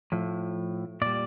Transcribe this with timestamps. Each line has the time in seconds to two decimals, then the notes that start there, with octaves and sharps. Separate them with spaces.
0.12 A2 F3
1.01 A#2 G3 D5